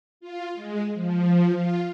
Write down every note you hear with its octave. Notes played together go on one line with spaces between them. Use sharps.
F4
G#3
F3
F4